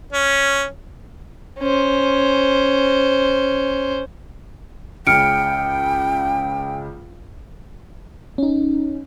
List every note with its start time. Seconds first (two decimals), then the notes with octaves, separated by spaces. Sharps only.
0.13 C#4
1.60 C#4 C5
5.07 C#2 C#3 G5 F6 C#7 D7
8.38 C#4 D#4